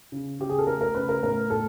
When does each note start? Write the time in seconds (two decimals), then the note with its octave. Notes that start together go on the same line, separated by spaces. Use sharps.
0.12 C#3
0.39 C#3 G4
0.49 G#4
0.59 A4
0.67 A3 A#4
0.81 A#4
0.95 C#3 B4
1.09 A#4
1.23 A2 A#4
1.50 A2 A4